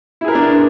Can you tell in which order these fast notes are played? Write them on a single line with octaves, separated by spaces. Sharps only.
E4 G#4 A#4 B4 D4